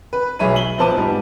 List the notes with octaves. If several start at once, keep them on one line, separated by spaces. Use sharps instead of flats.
B4
B1 G#4 C#5 E5 B5 D#7
F#7 G7
A#1 B3 C5 A5 D6 D#7
G#2 G3